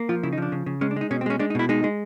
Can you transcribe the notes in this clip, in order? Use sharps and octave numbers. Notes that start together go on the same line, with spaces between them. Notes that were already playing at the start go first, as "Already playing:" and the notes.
Already playing: A#3
F3 F4
C#3 E4
D#4
F3 D4
C#3
C#3
G#3 C#4
D4
G#3 D#4
B2 C#4
C4
G#3 C#4
G#3 D4
D#4
B2 E4
G#3 D#4
G#3